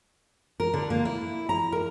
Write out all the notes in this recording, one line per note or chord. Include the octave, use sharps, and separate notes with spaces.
A#4
D3
A#3
E4
A#5
A#4